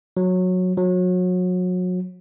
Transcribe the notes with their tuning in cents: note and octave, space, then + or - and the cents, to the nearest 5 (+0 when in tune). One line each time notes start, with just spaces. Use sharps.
F#3 -15
F#3 -30